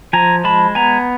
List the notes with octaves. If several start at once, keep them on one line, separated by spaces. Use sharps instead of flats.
F3 G#5 A#5
G#3 A5 B5
B3 G#5 A#5